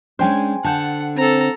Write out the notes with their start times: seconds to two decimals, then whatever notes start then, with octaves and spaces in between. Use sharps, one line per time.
0.19 G#3 C#4 D4 C5 G5 G#5
0.64 D3 F#5 A5 G6
1.17 C4 A4 A#5